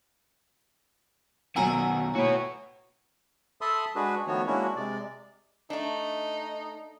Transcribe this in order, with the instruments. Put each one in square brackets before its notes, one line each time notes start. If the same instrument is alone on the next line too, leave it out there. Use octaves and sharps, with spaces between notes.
[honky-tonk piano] B1 F#3 E6 [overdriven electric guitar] B2 D#3 [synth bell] F#5 G#5 A#5
[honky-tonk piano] A2 [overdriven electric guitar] F#4 B4 [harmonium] C#5
[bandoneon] A4 E5 A5 B5 C6 D#6
G#3 D4 F#4 G#4 B4
D#3 F3 A3 B3 F#4 C#5
G#3 A#3 C#4 D4 E4 F#4
C3 G#3 D5
[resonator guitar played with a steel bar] A3 D4 [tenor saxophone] D#4